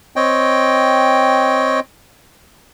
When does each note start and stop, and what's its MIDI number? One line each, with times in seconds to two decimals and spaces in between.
0.16 1.80 60
0.16 1.80 73
0.16 1.80 75
0.16 1.80 79